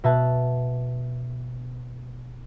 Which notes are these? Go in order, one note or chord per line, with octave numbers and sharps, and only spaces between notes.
B2 E5 A5 F#6